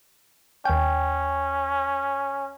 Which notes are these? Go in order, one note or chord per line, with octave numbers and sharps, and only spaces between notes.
D#2 C#4 G5